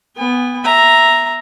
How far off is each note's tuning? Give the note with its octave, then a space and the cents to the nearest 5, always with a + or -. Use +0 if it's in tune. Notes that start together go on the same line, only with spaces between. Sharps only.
B3 +0 G#5 -40
E5 +0 A#5 +0